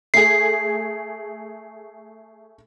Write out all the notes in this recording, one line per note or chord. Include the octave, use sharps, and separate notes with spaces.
A3 G#4 C7